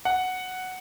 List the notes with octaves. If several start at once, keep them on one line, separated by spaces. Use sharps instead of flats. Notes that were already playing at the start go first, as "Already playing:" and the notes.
F#5